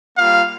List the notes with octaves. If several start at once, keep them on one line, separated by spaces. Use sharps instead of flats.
G3 A#3 F4 F5